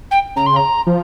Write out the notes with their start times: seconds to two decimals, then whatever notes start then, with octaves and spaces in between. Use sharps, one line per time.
0.11 G5
0.36 C#3 A#5
0.46 C6
0.56 A#5
0.87 F3